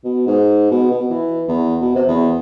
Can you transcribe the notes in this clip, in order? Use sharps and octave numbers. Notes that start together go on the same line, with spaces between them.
B2
G#2
B2
B2
E3
E2
B2
C3
E2